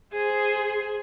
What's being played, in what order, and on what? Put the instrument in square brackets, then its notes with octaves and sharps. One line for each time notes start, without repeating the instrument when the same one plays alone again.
[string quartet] G#4 C5 G#5